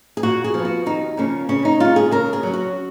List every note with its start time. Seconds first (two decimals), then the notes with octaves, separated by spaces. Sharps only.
0.17 G#4
0.23 A#2 F#4
0.44 G#4
0.54 F3
0.59 B3
0.65 F#4
0.86 D#2 D#4
1.17 C#3 F3 A#3 C#4
1.49 C#3 C#4
1.65 D#4
1.80 G#3 C#4 F4
1.96 G#4
2.11 C#3 A#4
2.33 G#4
2.43 F#3 C#4
2.53 F#4